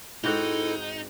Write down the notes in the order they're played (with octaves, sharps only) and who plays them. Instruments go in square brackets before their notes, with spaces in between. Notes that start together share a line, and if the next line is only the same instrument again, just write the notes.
[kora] G#2 C4 F#4 [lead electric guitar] D#4 [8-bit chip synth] E4 A4